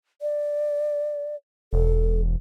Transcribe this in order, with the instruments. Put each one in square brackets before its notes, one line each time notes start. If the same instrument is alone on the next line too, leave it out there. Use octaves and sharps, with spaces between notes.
[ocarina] D5
[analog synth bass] E1 [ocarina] A4